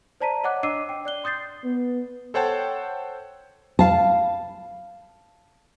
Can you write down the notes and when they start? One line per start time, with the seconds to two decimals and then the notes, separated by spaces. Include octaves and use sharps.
0.20 C5 D5 A5 A#5 B6 D#7
0.44 C#5 D#5 F#5 D6 F#6
0.63 D4 D#5 D6 E6 C7 D#7
0.89 G5
1.05 D5 F#6 G7
1.24 C6 D#6 G6 A6 C7
1.64 B3
2.34 A4 C5 C#5 F#5 G5 A5
3.79 F5 A5